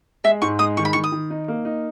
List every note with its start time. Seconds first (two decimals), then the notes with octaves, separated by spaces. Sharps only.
0.24 G#3 E5
0.42 G#2 C#6
0.59 G#3 D#6
0.77 D#3 C#6
0.85 B5
0.93 D#3 C#6
1.04 D#6
1.12 D#3
1.30 D#4
1.48 A#3
1.65 D#4